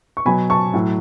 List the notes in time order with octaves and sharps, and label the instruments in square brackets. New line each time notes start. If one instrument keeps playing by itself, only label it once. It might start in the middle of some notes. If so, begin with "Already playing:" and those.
[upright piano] C#6
B2 F#3 G#5 B5
A5 C#6
A2 F#3